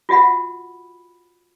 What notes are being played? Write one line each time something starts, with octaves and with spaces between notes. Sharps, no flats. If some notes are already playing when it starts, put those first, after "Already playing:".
F4 F#4 E5 F#5 B5